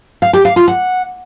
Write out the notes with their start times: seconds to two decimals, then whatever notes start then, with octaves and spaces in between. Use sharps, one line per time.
0.22 F5
0.33 G4
0.45 F5
0.56 F4
0.68 F#5